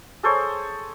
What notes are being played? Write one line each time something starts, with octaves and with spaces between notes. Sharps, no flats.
G#4 A4 C5 C#5